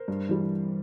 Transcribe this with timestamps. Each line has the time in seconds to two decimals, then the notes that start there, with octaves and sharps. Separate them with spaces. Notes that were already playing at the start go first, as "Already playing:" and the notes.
Already playing: A#4 C5
0.08 G2
0.29 E3 G3